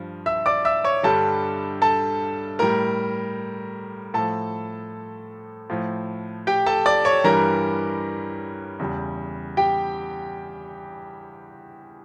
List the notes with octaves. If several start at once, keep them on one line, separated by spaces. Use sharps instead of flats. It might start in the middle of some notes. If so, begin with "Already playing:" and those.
Already playing: G2 F3
E5 E6
D5 D6
E5 E6
C#5 C#6
G2 D3 G3 A4 A5
A4 A5
A2 G3 A#4 A#5
A2 F3 A4 A5
A2 F3
G4 G5
A4 A5
D5 D6
C#5 C#6
G2 E3 G3 A#4 A#5
E2 C#3 G3
G4 G5